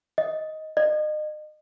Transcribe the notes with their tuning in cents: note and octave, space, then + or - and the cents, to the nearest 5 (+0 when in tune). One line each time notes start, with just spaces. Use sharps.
D#5 +10
D#5 -35